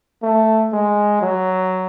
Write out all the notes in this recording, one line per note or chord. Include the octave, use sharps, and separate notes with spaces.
A3
G#3
F#3